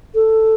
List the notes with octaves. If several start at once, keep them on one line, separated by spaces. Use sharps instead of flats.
A4